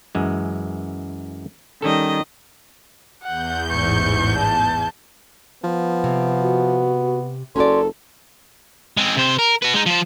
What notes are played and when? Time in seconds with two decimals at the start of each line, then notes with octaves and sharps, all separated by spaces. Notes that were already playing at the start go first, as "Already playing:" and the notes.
0.15 F#2 E3 G#3
1.82 D#3 G3 C#4 A4 D#5
3.23 E2 F#5 G6
3.71 A1 G#2 C#6
4.38 A5
5.64 F3 B3
6.04 C3
6.41 F#4
7.56 F#1 C#4 F#4 A4 D5 C6
8.97 G#3 C4
9.17 C3 C5
9.39 A#4
9.62 F#4 B4
9.74 G#3 D#4
9.86 F3 C5